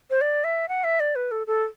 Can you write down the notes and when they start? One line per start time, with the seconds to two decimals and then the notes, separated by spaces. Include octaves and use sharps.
0.10 C5
0.21 D5
0.44 E5
0.69 F#5
0.84 E5
1.00 D5
1.15 B4
1.31 A4
1.47 A4